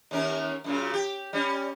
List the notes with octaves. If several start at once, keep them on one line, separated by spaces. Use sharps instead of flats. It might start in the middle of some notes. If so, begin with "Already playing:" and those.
D#2 C#4 A#4
F#2 A#2 C#3
G4
G3 C#4